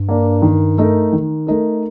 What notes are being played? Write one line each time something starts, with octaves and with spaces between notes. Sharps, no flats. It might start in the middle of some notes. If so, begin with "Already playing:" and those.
Already playing: G2
A#3 D4
D#3
A3 D#4 A#4
D#3
A3 D#4 A#4